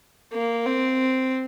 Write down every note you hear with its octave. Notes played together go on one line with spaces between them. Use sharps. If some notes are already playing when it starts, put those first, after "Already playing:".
A#3
C4